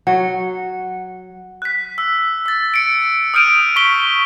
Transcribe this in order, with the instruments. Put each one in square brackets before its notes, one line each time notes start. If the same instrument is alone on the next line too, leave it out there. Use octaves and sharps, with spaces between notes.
[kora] F#3 [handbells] F#5
[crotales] F#6 B6
E6
E6 A6
C#7 D7
D#6 F6 G6 D7 D#7 F7
C#6 B6 G7